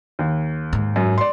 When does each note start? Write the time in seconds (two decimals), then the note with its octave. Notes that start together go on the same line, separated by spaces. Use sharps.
0.19 D#2
0.73 G#2
0.96 F#2
1.18 D5 C6